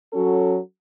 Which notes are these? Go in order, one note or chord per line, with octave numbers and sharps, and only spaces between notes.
F#3 C#4 F#4 A4